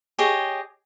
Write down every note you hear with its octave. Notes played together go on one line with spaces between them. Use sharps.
G4 G#4 C#5 D#5